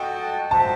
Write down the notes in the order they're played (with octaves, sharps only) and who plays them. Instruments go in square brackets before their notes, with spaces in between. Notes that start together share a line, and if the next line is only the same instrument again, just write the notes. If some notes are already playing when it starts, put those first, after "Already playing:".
Already playing: [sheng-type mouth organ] F#4 A4 D#5 F#5 A5 [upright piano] G5
[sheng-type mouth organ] F#4 C5 E5 [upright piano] A5